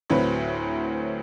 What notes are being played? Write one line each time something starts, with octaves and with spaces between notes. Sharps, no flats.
D2 A2 F#3 C4 B4